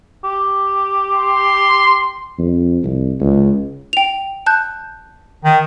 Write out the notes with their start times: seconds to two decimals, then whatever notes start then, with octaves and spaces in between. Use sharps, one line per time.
0.24 G4
1.13 C6
2.38 F2
2.83 C2
3.20 C#2
3.93 G5 F7
4.46 A5 F#6 G6
5.45 D#3